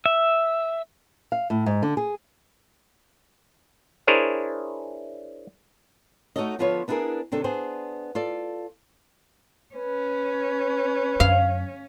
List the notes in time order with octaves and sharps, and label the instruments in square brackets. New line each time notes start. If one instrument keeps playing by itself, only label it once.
[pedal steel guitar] E5
[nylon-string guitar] F5
A2
G#2
D3
G#4
[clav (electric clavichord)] D4 E4 G#4 A#4 C5 C#5
[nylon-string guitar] A3 D#4 F#4 A4 C#5 D#5
D3 F3 B3 F4 B4 C#5
B3 D4 E4 F4 G#4 A#4
C3 D#3 D4 A4
B3 D4 G#4 C5
F4 A4 D5
[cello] C#4 [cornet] B4
[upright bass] F#2 [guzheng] F5